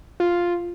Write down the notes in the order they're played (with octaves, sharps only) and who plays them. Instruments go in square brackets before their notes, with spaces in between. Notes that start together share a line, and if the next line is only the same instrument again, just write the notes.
[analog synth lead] F4